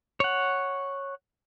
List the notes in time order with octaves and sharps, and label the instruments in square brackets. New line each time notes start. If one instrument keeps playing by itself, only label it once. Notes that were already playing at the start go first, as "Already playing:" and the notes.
[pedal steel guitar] C#5 F#5